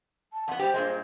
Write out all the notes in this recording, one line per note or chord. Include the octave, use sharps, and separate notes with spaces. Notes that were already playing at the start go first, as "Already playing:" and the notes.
A5
F2 B3 F#5
G3 G4 C5
G2 A#2 G#3